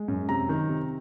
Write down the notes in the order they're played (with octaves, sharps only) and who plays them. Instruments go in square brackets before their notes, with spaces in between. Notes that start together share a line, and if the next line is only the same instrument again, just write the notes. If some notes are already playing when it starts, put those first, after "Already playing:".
Already playing: [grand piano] G#3
F#2
C3 A#5
D#3
C3